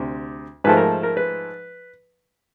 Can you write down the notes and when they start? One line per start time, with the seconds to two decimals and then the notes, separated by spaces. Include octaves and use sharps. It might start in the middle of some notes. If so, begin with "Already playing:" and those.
Already playing: D2 C3
0.64 G#2 F3 A3 B4
0.77 A#4
1.03 A#4
1.17 B4